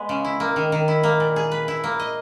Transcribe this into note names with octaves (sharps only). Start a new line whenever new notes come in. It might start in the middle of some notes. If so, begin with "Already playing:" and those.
Already playing: G#3 B3
C#3
E4
A#3
D#3
D#3
E4
A#3
A#2
G#4
B4
E4
A#3
D#5